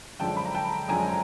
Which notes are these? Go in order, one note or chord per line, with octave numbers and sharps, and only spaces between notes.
F#2 D3 F3 G#3 G5 A5
B5
A#5
G5 A5
F#2 D3 F3 G#3 G#5 A#5